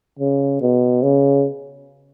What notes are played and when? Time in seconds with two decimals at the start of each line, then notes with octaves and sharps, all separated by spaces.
0.19 C#3
0.61 B2
1.03 C#3